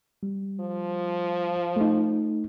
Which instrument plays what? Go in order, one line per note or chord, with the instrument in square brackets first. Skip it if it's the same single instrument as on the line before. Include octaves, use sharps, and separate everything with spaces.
[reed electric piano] G3
[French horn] F3
[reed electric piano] A3 D#4